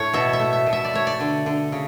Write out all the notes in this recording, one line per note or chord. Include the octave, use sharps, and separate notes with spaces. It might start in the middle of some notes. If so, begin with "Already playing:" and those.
Already playing: A2 A3 C#5
B2 E5
E5
A3
E5
B2
E5
D5
A3 C#5
D5
D3
D3
C#3